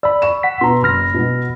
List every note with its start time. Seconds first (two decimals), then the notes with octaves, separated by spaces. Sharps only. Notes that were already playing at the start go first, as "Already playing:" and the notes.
0.03 D5 B5 E6
0.22 C#6 E7
0.43 F#5 B6
0.61 B2 B4 A#5 C6
0.83 F#1 B5 F6 A#6
1.14 B2 B3